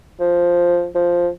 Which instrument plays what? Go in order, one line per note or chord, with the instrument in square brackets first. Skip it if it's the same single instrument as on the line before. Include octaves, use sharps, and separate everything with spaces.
[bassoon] F3
F3